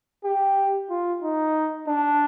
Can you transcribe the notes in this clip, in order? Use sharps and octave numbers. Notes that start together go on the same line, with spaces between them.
G4
F4
D#4
D4